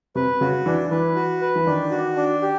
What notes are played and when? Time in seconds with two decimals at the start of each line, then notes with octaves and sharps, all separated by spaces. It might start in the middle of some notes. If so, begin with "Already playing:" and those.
0.15 C3 B4
0.41 C#3 F#4
0.66 E3 D4
0.91 E3 B4
1.16 F#4
1.41 B4
1.55 E3
1.66 D#3 D4
1.91 F#4
2.16 D4
2.42 G4